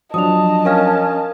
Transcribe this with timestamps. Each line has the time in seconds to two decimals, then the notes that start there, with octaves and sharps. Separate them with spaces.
0.14 F3 F#3 D4 D#5 A5 D#6 F7
0.65 C#4 A#4 F5 F6